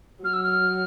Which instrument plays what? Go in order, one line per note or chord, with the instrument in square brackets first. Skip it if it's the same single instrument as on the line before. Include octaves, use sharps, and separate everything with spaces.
[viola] F#3 [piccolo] F6
[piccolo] E6
F6